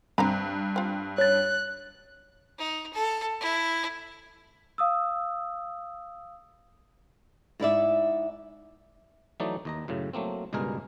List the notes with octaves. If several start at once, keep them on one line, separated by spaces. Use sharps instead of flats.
G2 C4 A#5 B5
C4 F4
C#5 F#6 A6
D#4
A4
E4
F5 D#6 E6
G#2 E4 D5 E5
E3 F#3 A3 D#4 D5
D#2 D#5 A#5
F#2 A2 C#3
F#3 A3 A#3 C4
C#2 G2 B2 G#3 G#4 A#4